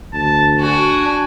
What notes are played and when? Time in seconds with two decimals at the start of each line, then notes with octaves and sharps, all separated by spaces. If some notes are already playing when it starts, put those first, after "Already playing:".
0.13 D2 A5
0.60 D4 F#4 G#5